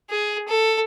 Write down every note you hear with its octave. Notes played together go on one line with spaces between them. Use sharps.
G#4
A4